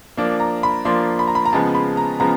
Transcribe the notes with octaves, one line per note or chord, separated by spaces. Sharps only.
F3 A#3 D4
A#5
B5
F3 A#3 D4 C6
B5
A#5
B5
A#5
C#3 F3 G#3 B3 A5
B5
A#5
C#3 F3 G#3 B3 A#5